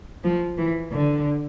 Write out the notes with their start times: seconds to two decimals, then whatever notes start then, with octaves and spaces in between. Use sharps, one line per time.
0.24 F3
0.58 E3
0.92 D3